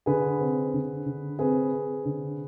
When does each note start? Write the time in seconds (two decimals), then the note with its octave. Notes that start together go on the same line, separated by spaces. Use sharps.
0.06 D3 G#4 B4
0.41 C4
0.74 D3
1.06 D3
1.39 C4 G#4 B4
1.73 C4
2.05 D3